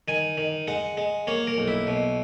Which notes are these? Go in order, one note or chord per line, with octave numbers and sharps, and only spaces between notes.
D#3 G#5
D#3
G#3 F#5
G#3
A#3 C#5
A#4
B1
E4
B2